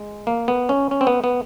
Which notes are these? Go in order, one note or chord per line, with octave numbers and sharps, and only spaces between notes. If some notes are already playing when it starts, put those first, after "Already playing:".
Already playing: G#3
A#3
B3
C#4
C#4
C4
B3
B3